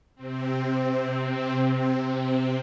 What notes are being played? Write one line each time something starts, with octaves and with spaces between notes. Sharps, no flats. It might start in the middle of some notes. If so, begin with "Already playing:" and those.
C3 C4